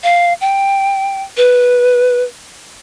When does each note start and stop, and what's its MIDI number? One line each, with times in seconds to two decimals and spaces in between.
0.03 0.34 77
0.41 1.23 79
1.37 2.24 71